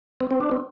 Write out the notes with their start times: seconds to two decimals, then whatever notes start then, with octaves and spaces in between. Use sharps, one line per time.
0.21 C4
0.31 C4
0.40 D4
0.51 C4